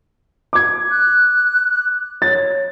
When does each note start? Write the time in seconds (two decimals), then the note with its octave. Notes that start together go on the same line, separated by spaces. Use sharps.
0.53 D6 G#6
0.91 F#6
2.22 C#5 A6